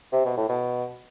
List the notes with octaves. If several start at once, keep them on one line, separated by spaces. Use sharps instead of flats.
C3
B2
A2
B2